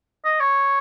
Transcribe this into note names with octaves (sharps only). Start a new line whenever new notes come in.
D#5
C#5